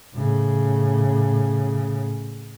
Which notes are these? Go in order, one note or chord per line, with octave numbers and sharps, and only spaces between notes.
A2 C#3